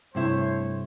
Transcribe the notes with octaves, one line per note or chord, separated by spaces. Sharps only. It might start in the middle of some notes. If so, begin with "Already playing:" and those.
G2 C3 A3 E4 C5 C#5